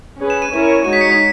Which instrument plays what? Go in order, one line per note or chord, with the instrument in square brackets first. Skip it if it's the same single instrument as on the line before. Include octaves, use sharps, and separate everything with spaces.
[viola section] C#4 G#4 B4
[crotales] E7
D#7
[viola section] C#4 E4 A#4 C#5 [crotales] E7
[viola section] G#3 D#4 F#4 C#5 [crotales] D#7
[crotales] B6
C#7
B6